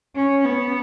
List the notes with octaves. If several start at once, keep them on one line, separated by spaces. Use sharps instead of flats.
C#4
B3